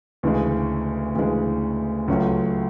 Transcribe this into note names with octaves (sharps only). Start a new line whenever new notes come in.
D2 C#3 E3 G#3
D2 C#3 E3 G#3
C#2 C#3 F#3 A3 C#4